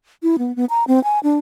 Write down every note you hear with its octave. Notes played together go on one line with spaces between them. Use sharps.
E4
B3
B3
A#5
C4
G#5
D4